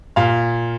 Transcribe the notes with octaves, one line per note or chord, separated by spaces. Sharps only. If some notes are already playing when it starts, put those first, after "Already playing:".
A#2 F5